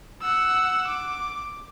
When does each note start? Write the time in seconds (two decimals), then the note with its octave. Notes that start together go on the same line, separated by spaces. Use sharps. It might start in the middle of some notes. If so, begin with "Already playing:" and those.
0.21 F#5 E6
0.87 D6